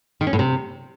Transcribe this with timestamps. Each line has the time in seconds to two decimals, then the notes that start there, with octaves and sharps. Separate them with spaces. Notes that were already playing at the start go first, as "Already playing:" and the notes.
0.21 D#3
0.27 C#4
0.33 A2
0.39 C3